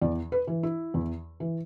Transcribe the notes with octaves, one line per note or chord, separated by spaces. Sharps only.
E2 D5
B4
E3
E4
E2
E3